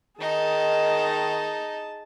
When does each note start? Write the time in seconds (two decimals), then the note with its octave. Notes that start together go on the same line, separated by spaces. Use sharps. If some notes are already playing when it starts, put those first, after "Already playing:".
0.20 D#3 D#4 G#4 A5